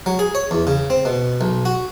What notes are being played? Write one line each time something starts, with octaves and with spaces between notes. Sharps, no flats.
F#3
G#4
C#5
E2
C#3
C4
B2
B1
F#4